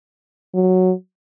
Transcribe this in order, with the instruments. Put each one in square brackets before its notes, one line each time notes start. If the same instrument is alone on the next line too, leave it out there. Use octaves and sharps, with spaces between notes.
[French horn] F#3